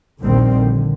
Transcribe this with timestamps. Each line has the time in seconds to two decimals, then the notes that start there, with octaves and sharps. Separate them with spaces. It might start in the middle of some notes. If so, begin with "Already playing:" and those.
0.22 A#1 D#2 D3 D#3 G3 C4
0.56 D3